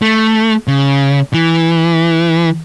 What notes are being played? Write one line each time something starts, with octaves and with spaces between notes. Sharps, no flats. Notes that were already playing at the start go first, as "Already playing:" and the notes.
A3
C#3
E3